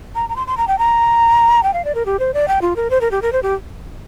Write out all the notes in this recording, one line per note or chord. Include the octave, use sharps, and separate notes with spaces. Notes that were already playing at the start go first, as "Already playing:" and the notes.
A#5
A#5
C6
C6
A#5
G5
A#5
G5
F5
D5
A#4
G4
C5
D5
G5
F4
A#4
C5
A#4
G4
A#4
C5
G4